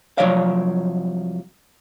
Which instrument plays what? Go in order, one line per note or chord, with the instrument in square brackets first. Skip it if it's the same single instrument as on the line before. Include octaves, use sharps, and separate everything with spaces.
[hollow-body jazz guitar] C2 F3 F#3 C#5 D5 F5